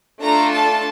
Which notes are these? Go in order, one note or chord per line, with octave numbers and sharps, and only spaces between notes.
A3 D4 F4 A4 A#5
A5